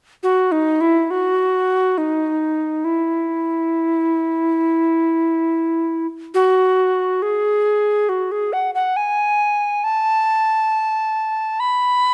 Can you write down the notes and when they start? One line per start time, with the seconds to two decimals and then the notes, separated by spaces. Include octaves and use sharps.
0.23 F#4
0.52 D#4
0.81 E4
1.11 F#4
1.98 D#4
2.85 E4
6.34 F#4
7.22 G#4
8.09 F#4
8.32 G#4
8.53 F#5
8.75 F#5
8.96 G#5
9.84 A5
11.60 B5